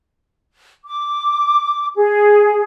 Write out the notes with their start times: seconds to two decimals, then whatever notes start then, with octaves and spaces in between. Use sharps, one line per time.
0.84 D6
1.95 G#4